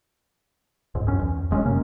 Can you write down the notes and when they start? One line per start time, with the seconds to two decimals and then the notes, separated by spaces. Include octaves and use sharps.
0.95 C#2 G#2
1.06 C#2 F#2 C#4
1.21 E2
1.51 E1 G#3 A#3 C#4
1.66 F#2 C3 A#3 C#4